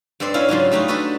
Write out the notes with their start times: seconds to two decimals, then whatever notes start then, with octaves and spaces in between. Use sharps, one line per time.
0.20 G2 C4 A4 D5 C6
0.34 C4 C#4 E4 C#5 F5 G#5
0.48 G#2 C#3 F#3 F4
0.71 G3 A3 D#4 F4 F#4
0.88 D4 D#4 F#4 A4 B4